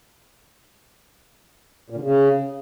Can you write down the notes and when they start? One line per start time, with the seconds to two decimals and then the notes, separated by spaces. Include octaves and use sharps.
1.90 A#2
1.96 D3
2.02 C#3